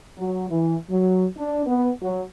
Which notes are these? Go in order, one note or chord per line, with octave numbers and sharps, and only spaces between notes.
F#3
E3
F#3
D4
B3
F#3